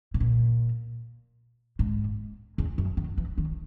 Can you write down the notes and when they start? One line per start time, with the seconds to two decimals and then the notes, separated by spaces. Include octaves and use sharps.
0.14 B2
0.20 A#2
1.79 G#2
2.58 E2
2.78 F#2
2.97 D#3
3.18 E3
3.38 D#3